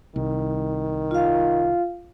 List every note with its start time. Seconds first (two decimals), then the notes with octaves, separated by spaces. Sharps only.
0.16 C2 D#3
1.11 F4 F5